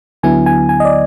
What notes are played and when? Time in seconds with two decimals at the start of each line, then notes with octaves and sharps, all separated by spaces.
0.23 D2 D3 F#3 B3 E4 G#5
0.46 G#5
0.69 G#5
0.80 D#5
0.85 D5